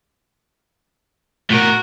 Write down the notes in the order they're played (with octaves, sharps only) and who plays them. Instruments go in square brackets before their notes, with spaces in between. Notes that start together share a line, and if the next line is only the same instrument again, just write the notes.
[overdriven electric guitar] A2 A#4 [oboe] F#4